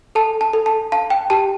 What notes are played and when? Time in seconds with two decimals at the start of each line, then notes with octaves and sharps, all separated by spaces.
0.15 A4 A5
0.41 A5
0.53 A4
0.66 A5
0.92 F5 A5
1.10 G5
1.30 G4 A5